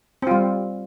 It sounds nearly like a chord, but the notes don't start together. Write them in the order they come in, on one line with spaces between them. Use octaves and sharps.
C4 F4 G3